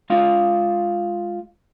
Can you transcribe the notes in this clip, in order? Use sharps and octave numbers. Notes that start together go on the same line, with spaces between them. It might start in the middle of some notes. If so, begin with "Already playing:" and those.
G#3 F4 F5